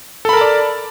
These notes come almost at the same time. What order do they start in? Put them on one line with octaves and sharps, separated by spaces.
A4 B5 A#4 A5 D5